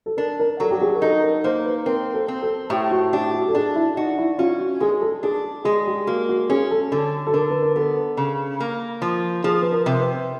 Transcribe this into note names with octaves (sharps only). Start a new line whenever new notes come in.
A4
D4 A#4
A#4
F#3 A4
G4
G#4
A#4
D#4 A4
A#4
A#3 C5
B4
C4 A#4
A4
C4
A4
A2 G4
F#4
D4 G4
F#4
A4
D4 G#4
E4
D#4 F#4
E4
C#4 F4
F#4
G#3 G#4
A4
D4 G#4
G#3 G#4
G4
A#3 F#4
F#4
C#4 G#4
A4
D3 A4
A4
D3 A#4
B4
A#4
B3 A4
C#3
A#3
F3
F3 G#4
B4
A#4
C3
B4